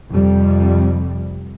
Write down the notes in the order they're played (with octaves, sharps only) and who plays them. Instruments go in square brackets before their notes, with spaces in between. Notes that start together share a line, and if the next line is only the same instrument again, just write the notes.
[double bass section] F2 C3 G3